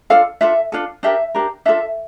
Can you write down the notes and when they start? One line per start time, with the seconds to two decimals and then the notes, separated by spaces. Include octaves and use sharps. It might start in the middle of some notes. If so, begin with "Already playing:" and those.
0.10 D4 F4 A4 F5
0.41 D4 F4 A4 E5
0.72 D4 F4 A4
1.03 D4 G4 A#4 E5
1.35 D4 G4 A#4
1.66 D4 F4 A4 E5